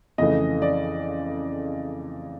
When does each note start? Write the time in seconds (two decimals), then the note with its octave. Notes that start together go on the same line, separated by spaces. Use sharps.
0.18 F2 C#3 E3 A3 D#5
0.62 D5